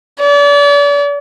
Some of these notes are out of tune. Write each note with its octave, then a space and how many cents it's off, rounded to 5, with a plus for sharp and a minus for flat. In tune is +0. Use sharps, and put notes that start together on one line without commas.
D5 -40